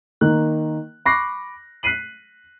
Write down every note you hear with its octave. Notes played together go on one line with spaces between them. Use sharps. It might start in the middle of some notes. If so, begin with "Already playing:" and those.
D#3 A#3 F#6
B5 C#6 D6 F#6 A#6 C7
F#6 B6 C7 D#7 F#7